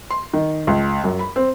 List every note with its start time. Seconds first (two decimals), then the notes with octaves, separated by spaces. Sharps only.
0.10 C6
0.34 D#3
0.67 C#2
1.04 F#2
1.19 B5
1.36 C4